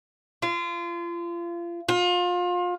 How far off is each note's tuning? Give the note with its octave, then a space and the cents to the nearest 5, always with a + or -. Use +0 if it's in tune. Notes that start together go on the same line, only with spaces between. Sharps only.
F4 -30
F4 +30